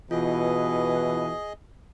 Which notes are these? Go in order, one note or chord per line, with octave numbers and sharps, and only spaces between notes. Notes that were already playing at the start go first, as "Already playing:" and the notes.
B2 E3 F4 G#4 D#5